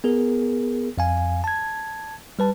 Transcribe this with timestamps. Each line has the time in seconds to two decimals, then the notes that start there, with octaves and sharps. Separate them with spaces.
0.04 B3 G#4 A#4
0.98 F2 F5 G#5
1.44 A5 G#6
2.39 G3 B4 A5